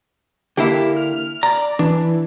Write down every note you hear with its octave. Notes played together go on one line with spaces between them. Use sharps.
D3 A#3 E4 G4
F6
D5 A#5
E3 D4